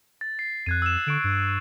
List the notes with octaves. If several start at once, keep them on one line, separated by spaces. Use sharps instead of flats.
A6
C7
F2 F#6 G#6 D#7
E6 E7
D3 C#6 D7 E7
G2